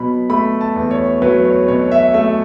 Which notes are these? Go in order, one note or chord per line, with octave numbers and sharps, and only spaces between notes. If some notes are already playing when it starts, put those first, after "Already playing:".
Already playing: B2 F#3 B5
A3 B5
A5
E2
C#5
F#3 B4
C#5
B2 C#5
E5
A3 E5